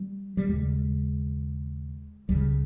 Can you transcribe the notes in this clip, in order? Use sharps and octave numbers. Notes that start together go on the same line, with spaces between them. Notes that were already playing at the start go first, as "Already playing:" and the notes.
Already playing: G3
G3
D#2 C#3 G#3
C#2 C#3 G3